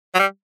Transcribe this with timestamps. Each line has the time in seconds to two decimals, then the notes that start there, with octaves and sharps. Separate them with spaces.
0.15 F#3
0.19 G3